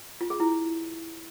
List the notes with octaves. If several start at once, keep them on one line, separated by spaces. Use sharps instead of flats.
F4
G#4
E4